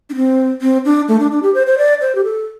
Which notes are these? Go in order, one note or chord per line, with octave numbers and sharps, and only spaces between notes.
D4
C4
C4
D4
A3
D4
D4
G4
C5
C5
D5
C5
G4
A4